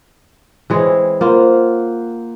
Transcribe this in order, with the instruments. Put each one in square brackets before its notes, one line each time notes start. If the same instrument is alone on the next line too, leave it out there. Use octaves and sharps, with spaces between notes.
[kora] E3 G#3 C#5 [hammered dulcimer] C4
[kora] A#3 F4 [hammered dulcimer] C5 F#5